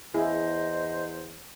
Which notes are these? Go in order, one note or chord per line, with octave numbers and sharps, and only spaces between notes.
E2 E4 G#4 C5 D#5